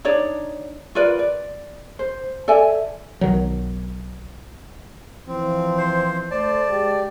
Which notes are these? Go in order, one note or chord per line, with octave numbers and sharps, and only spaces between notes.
D4 D#4 C#5 D5
F4 A#4 B4 D5
D5
C5
A4 D5 E5 G#5
B1 D#3 F#3
E3 F3 C4
C5
A3 C5 D5 A5
G#3 G4